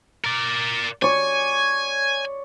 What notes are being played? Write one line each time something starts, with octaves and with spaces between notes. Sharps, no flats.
A#4 D5
C#5 D5 G#5